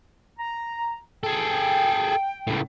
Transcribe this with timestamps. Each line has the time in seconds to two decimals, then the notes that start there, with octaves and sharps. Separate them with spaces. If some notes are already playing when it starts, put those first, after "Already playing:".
0.39 A#5
1.23 G#4 A4 G5
2.47 C#2 A2